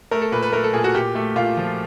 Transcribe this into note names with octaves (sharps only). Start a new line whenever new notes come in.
A3 A#4
A4
A#2 B4
B4
A3 A#4
A4
A#2 G#4
F#4
A#2 G4
A3
A#2 F4
F3